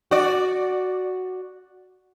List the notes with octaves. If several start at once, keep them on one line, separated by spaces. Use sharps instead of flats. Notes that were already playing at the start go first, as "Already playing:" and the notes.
F#4 D5